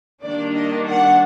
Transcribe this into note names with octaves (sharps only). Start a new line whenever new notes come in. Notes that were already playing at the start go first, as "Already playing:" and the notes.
D#3 G3 A#3 D4 D5
D#5
F#5